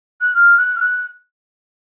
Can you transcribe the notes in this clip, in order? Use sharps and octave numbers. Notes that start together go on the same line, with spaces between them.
F#6
F6
F#6
F6
F#6